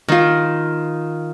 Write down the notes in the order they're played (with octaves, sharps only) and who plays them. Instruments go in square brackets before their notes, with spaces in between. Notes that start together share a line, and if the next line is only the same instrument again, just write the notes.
[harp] D#3 F4